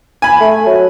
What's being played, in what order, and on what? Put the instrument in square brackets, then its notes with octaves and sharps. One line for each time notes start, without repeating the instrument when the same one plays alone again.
[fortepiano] G#5 B5
[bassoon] A3
F#3